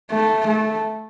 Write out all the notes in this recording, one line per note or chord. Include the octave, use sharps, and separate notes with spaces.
A3
A3